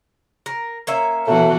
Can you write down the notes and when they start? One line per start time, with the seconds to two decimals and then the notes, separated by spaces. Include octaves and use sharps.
0.46 A#4
0.87 A#3 C#4 E5
1.27 B2 E3 A3 F#4